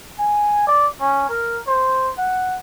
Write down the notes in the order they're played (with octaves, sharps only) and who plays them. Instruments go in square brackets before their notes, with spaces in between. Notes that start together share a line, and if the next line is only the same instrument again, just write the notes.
[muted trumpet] G#5
D5
C#4
A#4
C5
F#5